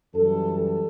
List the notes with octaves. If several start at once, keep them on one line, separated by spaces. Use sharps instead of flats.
F#2 E3 G3 A4
A4